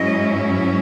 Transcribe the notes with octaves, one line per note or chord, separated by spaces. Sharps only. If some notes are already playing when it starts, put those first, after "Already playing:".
Already playing: G#2 F#3 C#4 E4 D#5